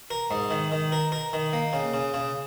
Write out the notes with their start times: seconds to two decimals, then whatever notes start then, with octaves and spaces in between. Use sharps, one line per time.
0.10 A#4
0.31 G#2
0.51 D#3
0.72 D#3
0.92 A#4
1.12 A#4
1.33 D#3
1.53 A#3
1.73 C#3
1.94 C#3
2.14 C#3